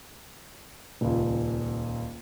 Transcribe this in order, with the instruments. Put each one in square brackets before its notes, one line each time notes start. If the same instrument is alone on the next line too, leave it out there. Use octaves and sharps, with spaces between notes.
[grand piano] D#1 C#2